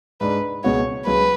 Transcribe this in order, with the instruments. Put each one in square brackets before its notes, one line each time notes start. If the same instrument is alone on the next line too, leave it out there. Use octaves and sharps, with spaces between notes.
[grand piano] G#2 G#3 D4 [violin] B4
[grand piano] C#2 B2 G#3 B3 F#4 [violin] C#5
[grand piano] C#2 C#3 F#3 [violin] B4